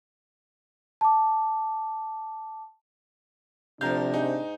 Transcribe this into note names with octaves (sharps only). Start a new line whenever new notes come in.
A5 D6
D2 C3 F3 D4 F5 A#5 G6
G#2 D#4